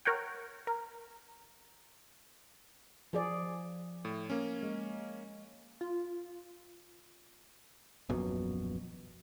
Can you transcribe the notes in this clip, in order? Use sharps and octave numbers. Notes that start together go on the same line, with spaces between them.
A#4 C#5 F#5 G5
A#4
F3 G#4 D5
A2
A#3 C#4
G#3
F4
D#1 A#1 F#2 B2